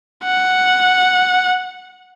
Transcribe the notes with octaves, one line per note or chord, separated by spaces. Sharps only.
F#5